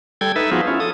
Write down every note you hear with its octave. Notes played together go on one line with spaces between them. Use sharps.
G3 A4 G5 G#6
D#4 A4 B4 E5
F3 B3 D#4 F4 F#4 G#4
C#4 E4 F4
A4 D#6